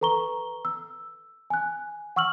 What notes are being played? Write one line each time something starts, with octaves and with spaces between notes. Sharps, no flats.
A4 B4 A#5 C#6 G7
E6
G#5 F#6
F#5 C#6 E6 F6 F#7